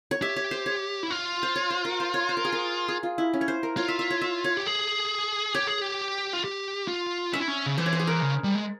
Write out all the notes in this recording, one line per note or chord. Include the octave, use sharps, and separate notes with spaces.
C#5
G4 E5
C#5
C5
C#5
E4
F4
C5
C#5
C5
A#4
C5
C#5
C5
A#4
G#4
A#4
G#4
F4
E4
C#4
C#5
C5
A#4
F4 C#5
E5
E5
C#5
E5
C#5
G4
G#4
G4 C#5
G#4
G4
F4
G4
F4
C#4 E5
E4
C#4
C#3
E3 C5
C#5
C5
G#4
A#4
C#3
G3
G#3